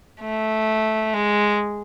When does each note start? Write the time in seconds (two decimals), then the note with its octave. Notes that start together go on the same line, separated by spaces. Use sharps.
0.21 A3
1.14 G#3